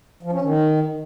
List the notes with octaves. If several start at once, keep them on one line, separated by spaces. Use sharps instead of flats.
F3
C#4
D#3